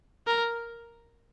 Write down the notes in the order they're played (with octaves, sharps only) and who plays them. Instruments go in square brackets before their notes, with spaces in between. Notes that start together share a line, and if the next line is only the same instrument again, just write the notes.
[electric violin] A#4